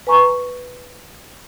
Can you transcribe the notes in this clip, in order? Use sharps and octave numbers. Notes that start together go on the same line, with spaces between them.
B4 G#5 A#5 C#6